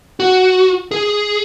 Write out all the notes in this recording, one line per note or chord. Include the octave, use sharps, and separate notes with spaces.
F#4
G#4